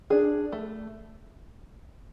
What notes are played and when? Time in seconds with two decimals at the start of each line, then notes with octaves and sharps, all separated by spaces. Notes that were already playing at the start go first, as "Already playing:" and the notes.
0.10 D4 G#4
0.52 A3